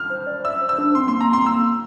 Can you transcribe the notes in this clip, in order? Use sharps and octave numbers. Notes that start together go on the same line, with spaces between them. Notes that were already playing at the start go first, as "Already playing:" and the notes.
Already playing: F6
C5
D5
E5 E6
C5
E6
D4
C4 C6
A#3 C6
A#3 A#5
C4 C6
A#3 E6